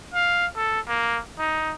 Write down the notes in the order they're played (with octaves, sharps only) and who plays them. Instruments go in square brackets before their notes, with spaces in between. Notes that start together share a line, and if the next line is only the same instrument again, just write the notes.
[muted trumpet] F5
A4
A#3
D#4